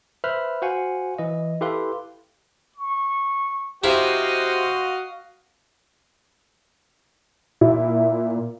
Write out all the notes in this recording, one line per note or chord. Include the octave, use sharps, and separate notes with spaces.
B4 C5 E5 B5 F6 F#6
F#4 C5 F5 F#5 G#5
E3 D#5
E4 G4 A4 B4 F5 C6
C#6
C3 E4 F#4 C5 D#5 F5
A#2 E4